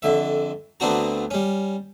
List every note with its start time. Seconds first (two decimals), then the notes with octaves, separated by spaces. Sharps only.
0.02 F2 D3 E5
0.80 D2 B3 C4 D4 F#4 A#5
1.31 G3 C#4